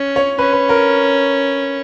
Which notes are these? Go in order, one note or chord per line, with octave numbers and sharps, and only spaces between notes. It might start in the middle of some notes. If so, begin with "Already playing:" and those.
Already playing: C#4
C#5
C#4 B4
B4
A#4